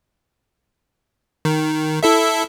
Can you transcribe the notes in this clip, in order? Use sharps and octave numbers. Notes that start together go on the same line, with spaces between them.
D#3
E4 A4 E5